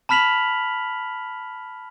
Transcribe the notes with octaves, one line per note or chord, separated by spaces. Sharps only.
A5 B5 F6 B6 F7 F#7